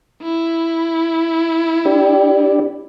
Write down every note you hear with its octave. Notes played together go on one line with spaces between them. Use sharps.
E4
D4 G4